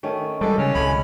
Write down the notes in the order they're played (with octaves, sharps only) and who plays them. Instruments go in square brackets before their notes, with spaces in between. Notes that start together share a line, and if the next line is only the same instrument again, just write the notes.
[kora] D#3 A3 C#4
[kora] E3 G#3 B4 [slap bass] G3 [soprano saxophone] A4
[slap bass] C#3 [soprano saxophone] C#4
[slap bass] C#2 C3 [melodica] G#5 B5